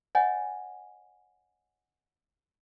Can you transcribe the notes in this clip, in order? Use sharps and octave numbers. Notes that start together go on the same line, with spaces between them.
C#5 D#5 F#5 G#5